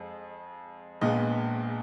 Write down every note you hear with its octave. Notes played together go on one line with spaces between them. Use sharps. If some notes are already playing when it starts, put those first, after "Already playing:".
Already playing: F2 G#3
A#1 A#2 G#3 B3 D#5